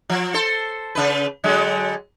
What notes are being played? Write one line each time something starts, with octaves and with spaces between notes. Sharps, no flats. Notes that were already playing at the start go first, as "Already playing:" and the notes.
F3
A4 C5
C#3 B4
D3 F#3 G#3